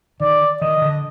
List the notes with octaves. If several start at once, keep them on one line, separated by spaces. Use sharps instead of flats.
D#3 D5
D#3 D#5
D3